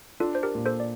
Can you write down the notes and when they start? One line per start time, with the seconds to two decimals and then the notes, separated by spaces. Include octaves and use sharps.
0.20 D4 F4 A4
0.35 C5
0.43 G4 A#4
0.55 A#2
0.66 A4 C5
0.80 D5